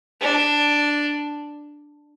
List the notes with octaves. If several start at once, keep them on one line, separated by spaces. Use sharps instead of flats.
D4